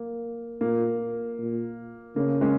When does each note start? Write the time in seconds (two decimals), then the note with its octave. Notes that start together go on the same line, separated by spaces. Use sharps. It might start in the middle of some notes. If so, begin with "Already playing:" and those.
Already playing: A#3
0.61 A#2 A#3
1.38 A#2
2.16 C#3 A#3
2.41 G#3 C#4